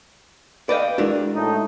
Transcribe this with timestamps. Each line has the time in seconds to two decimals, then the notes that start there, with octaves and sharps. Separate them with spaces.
0.69 B4 D5 D#5 F5 G5
0.98 G#3 D4 E4 F#4 A#4
1.34 A2 A3 D#4